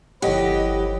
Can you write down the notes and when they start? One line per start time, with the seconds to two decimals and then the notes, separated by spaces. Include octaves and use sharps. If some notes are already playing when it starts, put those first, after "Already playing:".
0.22 G1 F3 E4 G4 A4 C#5 D#5 F#5